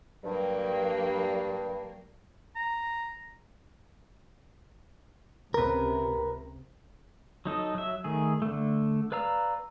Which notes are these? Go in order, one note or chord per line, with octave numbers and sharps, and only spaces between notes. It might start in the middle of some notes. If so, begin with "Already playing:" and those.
G2 F#3 G3 A#3
A#5
C#2 C3 A#4 B4
F#3 D#4 A4 D#5
F#3 E5
D#3 A3 G#4
D3 A3
B4 D5 F5 A#5 E6